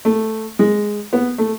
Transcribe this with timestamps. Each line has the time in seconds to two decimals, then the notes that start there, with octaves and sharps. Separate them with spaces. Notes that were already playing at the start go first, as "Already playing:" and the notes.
0.05 A3
0.59 G#3
1.13 B3
1.38 A3